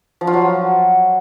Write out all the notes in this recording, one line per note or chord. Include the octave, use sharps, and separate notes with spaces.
F3
F4
F#3